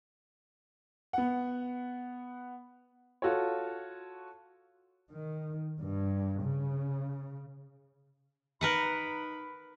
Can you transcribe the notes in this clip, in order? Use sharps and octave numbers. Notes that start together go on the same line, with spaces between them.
B3 F#5
F4 F#4 A4 C#5
D#3
G2
C#3
D#4 A#4 B4 F#5 B5